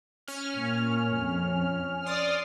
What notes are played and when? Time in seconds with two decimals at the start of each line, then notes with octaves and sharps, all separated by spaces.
0.28 C#4 F6
0.58 A#2
1.17 F2
2.06 D5 C6 D#6 F6